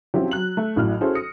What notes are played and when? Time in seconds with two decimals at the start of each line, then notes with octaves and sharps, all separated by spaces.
0.14 F3 C4 C#4 E4 F#4 G4
0.31 F#3 F#6 F#7
0.57 A3
0.76 A1 A2 F#3 F6
1.01 C#4 E4 F#4 G#4 A4 C5
1.15 D#6 A#6 C#7